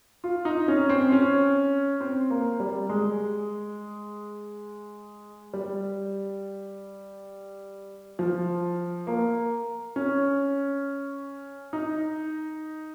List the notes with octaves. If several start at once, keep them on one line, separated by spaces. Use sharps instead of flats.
F4
D#4
C#4
C4
C#4
C4
A#3
G3
G#3
G3
F3
A#3
C#4
D#4